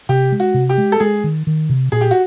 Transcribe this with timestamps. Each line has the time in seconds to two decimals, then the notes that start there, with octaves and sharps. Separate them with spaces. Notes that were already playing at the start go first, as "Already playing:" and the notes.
0.09 C3 G4
0.32 G#3
0.40 F#4
0.54 C3
0.69 G4
0.78 G#3
0.92 A4
1.00 G#3 G#4
1.24 D#3
1.47 D#3
1.69 C3
1.92 A#2 G#4
2.01 G4
2.11 F#4